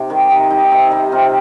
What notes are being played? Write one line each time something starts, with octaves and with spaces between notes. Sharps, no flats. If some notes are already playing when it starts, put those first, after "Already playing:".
Already playing: C3 D#4 G4
D#3 G3
C3 D#4
G3 D#4
C3 C4
G3 D#4
C3 C4 F4